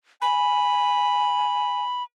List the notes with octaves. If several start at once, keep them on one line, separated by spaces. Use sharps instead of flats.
G#5 B5